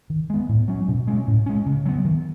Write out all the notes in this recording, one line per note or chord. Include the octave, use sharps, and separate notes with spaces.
D#3
G#3 B3
A2
F#3 C#4
B2
G#3 C#4
A2
G#3 C#4
C#3
F#3 B3
D#3